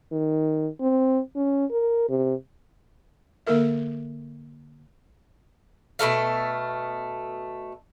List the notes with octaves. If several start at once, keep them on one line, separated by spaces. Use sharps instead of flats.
D#3
C4
C#4
A#4
C3
D3 A#3 A4 A#4 E5
B2 A3 A4 F5